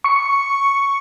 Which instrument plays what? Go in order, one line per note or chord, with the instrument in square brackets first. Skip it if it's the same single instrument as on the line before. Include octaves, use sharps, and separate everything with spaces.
[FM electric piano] C#6 C#7